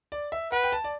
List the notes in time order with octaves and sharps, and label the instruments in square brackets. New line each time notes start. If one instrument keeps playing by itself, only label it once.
[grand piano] D5
E5
[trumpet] B4 [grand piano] F#5
[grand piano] G5
A5
D5